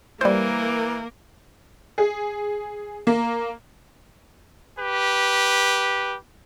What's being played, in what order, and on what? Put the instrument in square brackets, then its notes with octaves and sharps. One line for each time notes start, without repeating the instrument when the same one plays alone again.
[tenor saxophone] E3 [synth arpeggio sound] G3 C5 [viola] A#3 A#4
[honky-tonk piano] G#4
A#3
[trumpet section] G4 B4